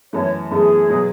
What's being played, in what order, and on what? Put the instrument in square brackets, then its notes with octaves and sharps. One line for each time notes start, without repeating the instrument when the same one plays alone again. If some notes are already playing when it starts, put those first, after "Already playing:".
[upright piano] F#2 E3 A3 [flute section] C#5
[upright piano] F#2 E3 A3 [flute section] G#4
[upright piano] B2 F#3 B3